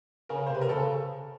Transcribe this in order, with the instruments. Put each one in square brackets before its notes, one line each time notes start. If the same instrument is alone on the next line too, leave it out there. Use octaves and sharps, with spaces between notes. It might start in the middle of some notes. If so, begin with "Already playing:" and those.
[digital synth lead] C#3 [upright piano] A#4
[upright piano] C5
[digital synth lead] C3 [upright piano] B4
[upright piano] A#4
[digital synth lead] C#3 [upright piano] A4